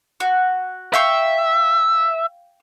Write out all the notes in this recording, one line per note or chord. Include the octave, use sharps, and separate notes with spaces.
F#4
E5 F5 G5 C#6